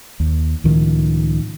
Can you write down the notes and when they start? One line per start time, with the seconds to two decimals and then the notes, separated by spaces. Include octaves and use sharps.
0.20 D#2
0.64 C#2 A2 D#3 F3